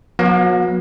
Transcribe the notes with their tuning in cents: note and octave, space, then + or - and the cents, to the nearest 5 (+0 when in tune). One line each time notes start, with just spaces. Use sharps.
F#3 -35 B3 -40 F5 +30